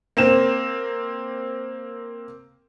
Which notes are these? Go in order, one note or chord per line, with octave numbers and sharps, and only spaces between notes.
A#3 C4 E7